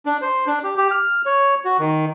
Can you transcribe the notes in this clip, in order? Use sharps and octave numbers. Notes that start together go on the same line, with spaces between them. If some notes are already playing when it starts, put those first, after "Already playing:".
D4
C5
D4
G4
G4
F6
C#5
F#4
D#3